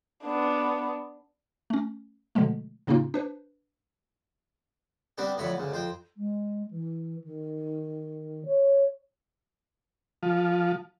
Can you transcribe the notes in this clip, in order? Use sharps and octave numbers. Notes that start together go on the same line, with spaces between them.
B3 D4
A3 C#4
B2 D3 F3 G#3 A3
A2 C#3 A#3 C#4 D#4 F4
D4 B4 C5
G3 B3 C4 D4 G4
F2 A2 D3 F#3 C#5 B5
D2 C#3
F2 C5 G5
G#3
E3
D#3
C#5
F3